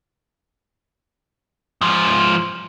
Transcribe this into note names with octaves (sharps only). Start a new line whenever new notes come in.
G#2 F3